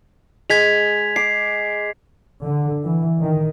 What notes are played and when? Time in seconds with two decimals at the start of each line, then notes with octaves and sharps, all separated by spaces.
0.50 G#3 G#6 B6 F7
1.16 D6 C7
2.43 D3
2.84 E3
3.20 D#3